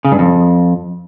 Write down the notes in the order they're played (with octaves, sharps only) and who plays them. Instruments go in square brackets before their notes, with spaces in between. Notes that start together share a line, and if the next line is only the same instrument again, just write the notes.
[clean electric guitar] C#3
G2
F2